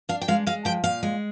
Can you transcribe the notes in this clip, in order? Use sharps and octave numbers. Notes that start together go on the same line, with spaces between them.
D4 F5
G5
G#3 F5
G#3 F5
F3 G5
A#2 F5
G#3